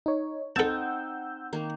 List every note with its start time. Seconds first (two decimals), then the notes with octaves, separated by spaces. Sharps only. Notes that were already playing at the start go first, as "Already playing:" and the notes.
0.06 D#4 C#5
0.56 C4 D#4 A4 F#5 A5 E6 G6
1.53 D#3 A#3